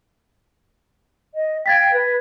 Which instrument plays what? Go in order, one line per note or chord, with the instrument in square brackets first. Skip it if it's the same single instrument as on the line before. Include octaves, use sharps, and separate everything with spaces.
[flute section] D#5
[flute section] F5 G5 [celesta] G#6 A6 B6
[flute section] B4